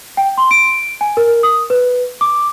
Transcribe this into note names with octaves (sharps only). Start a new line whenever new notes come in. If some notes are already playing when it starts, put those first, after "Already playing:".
G5
C6
D7
G#5
A#4
D#6
B4
D6